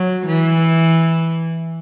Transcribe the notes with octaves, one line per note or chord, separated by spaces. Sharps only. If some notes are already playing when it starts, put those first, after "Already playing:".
Already playing: F#3
E3